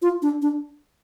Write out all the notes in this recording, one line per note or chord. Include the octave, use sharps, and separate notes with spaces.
F4
D4
D4